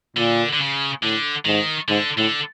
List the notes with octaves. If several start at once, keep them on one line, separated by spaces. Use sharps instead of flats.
A#2 D3
D3
C#3
A2 D3
G#2 D#3
G#2 D3
A2 D3